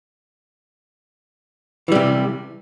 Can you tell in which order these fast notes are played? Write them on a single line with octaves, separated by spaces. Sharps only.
E3 G3 C3